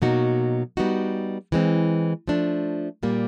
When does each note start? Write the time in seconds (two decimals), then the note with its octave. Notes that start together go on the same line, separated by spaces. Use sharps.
0.02 B2 F#3 A#3 D#4 F#4
0.77 G3 B3 D#4 F#4
1.52 E3 G#3 C4
2.28 F3 A3 D4
3.03 A#2 G3 A#3